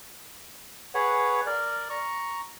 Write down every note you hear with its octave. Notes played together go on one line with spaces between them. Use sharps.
G#4 B4 C#5 F#5
A#4 D5
A#5 C#6